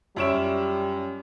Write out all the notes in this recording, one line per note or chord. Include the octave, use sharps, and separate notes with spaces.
F#2 G3 F4 C#5 E5 D7 E7